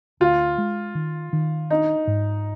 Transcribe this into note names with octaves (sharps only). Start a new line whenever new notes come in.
D2 F4
G#3
D#3
D#3
D4 D#4
G#2